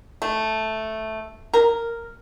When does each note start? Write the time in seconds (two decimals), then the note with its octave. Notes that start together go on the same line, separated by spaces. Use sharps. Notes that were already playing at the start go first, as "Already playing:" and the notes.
0.22 A3
1.54 A#4